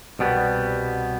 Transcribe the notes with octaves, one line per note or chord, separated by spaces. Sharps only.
C2 B2 G3 B3